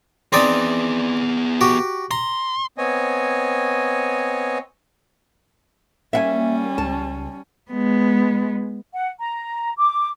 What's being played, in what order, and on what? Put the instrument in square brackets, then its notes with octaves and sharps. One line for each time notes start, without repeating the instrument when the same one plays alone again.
[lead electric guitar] B3 G#4 [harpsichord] C4 D#4 D5
[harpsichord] F#4 G4
[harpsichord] A#5 [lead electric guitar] C6
[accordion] B3 C4 C#5 D#5 G#5
[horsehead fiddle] G3 C#4 [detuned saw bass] A#3 [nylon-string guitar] E5 F#5 G#5
[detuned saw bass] C#2 [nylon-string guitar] A5
[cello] G#3 B3
[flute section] F#5
A#5
D6